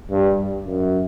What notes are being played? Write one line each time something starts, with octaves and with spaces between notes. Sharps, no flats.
G2
F#2